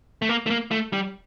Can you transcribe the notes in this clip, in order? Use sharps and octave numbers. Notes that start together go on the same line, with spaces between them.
A3
A#3
A3
A#3
A3
G3